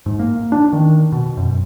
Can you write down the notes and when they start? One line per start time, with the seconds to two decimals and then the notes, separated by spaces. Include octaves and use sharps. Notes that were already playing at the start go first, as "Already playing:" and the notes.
0.06 G#2
0.19 A#3
0.52 D4
0.73 D#3
1.12 B2
1.37 F#2